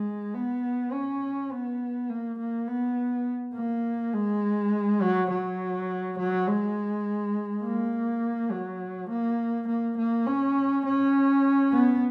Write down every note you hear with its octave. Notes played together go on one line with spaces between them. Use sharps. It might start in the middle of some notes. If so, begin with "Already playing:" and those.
Already playing: G#3
B3
C#4
B3
A#3
A#3
B3
A#3
G#3
F#3
F#3
F#3
G#3
A#3
F#3
A#3
A#3
A#3
C#4
C#4
B3